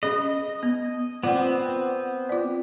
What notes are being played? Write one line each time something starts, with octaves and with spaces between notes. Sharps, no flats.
C#4 G#4 D#5
B3
B3 C4 F4 D5 F#5
F4 D5